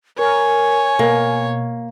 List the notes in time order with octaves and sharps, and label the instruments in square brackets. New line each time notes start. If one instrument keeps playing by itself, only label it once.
[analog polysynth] A#4 [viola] C#5 [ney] G#5
[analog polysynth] B2 [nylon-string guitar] A#3